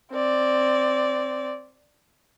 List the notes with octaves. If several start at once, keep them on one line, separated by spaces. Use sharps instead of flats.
C4 D5